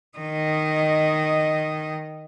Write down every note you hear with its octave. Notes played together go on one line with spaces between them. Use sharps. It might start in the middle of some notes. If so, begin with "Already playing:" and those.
D#3 D#5